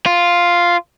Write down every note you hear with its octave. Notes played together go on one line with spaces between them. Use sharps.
F4